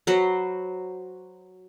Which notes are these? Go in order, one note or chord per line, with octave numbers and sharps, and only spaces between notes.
F#3 B4 C5